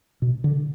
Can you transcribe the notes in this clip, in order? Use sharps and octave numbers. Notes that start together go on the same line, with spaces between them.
B2
D3